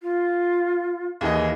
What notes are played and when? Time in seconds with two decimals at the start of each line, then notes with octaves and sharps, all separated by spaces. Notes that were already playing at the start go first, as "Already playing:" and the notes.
0.01 F4
1.21 D#2 E3 G#4 D#5